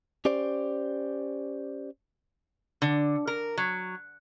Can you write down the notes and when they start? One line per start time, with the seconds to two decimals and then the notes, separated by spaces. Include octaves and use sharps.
0.25 C#4 G4 C5 D5
2.82 D3
3.27 A#4
3.57 F#3